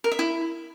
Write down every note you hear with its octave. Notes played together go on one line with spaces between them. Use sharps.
A#4
E5
E4